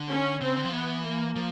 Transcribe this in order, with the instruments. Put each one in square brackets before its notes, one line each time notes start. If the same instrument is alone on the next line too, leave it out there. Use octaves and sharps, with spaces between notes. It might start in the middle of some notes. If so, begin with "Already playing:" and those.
Already playing: [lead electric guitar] D3
[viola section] C#4
[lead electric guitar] C#3 [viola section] C4
[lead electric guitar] D3
F3
[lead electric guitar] E3 [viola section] B3
[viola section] A#3
[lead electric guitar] F3